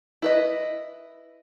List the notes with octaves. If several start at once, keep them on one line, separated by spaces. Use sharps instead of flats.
E4 B4 D#5